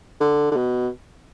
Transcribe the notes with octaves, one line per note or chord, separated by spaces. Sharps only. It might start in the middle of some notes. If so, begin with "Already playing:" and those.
D3
D3
B2